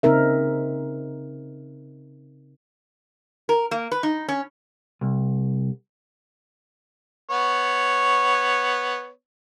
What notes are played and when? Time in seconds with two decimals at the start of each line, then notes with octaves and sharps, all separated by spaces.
0.03 C#3 C4 D#4 A#4 E5
3.49 A#4
3.71 A#3
3.91 B4
4.03 D#4
4.28 C#4
5.01 C2
7.30 B3 C#5